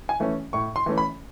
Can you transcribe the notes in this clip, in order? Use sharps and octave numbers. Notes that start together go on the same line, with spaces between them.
G#5
E3 A3 C#4
A2 C#6
C6
E3 A3 C#4
B5